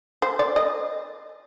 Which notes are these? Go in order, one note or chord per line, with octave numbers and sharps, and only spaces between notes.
C5
D5
D#5